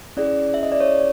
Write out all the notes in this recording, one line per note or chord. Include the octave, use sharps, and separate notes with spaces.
C#4 E4 G#4 D5
E5
D#5
D5
C#5